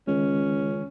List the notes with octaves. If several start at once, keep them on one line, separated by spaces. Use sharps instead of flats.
C#2 D#3 G#3 C#4